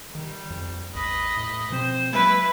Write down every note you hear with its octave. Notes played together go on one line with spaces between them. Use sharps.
D#3 G3
F2
A1 E2 B4 D#5
A2
B2 F3 C4 C5
F#3 G#3 A#3 E4 B4